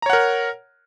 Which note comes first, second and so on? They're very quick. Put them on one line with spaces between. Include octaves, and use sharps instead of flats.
A#5 C#5 F#5 A#4